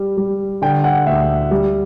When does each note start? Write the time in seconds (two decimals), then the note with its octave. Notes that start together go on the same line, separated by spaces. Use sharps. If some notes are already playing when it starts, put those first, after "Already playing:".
Already playing: G3
0.17 G3
0.62 D3 G5
0.84 F#5
1.06 D2 E5
1.51 G3